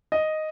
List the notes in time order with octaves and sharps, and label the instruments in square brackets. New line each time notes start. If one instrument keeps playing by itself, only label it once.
[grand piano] D#5